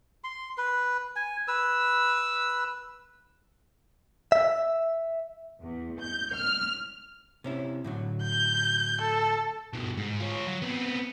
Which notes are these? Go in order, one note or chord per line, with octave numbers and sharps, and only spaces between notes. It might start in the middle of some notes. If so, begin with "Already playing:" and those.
C6
B4
G#5
B4 E6
E5
E2
G6
F6
C3 C#4 E4
A2 D3 F#3
G6
A4
G2 B2
G#2
F4 C#5
F#3
B3 C4